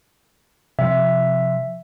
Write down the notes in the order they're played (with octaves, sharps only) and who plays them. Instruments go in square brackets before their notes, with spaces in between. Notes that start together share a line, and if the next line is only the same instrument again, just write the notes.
[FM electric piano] C3 F3 [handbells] E5